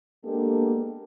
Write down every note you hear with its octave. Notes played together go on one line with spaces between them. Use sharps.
G#3 A#3 B3 D4 G4 A4